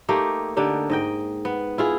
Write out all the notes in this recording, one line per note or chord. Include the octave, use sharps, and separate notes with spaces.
A3 A#3 D#4 G4
D3 D4 D#4 G4
G#2 D#5 G5
B3
E4 F4 G#4